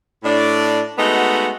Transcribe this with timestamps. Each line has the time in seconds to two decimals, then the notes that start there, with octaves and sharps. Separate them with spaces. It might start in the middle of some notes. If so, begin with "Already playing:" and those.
0.24 A2 D4 D5
0.98 G#3 A3 B3 D#4 F#4 F#5